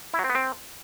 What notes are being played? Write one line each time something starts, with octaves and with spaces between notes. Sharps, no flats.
E4
F#3
C4
B3
C4